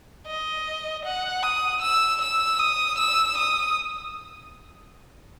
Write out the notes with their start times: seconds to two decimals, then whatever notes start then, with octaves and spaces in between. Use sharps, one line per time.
0.27 D#5
1.05 F#5
1.43 D#6
1.82 E6
2.21 E6
2.59 D#6
2.98 E6
3.38 D#6